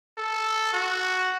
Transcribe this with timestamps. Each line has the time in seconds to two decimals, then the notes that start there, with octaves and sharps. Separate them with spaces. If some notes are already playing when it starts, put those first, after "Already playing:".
0.18 A4
0.73 F#4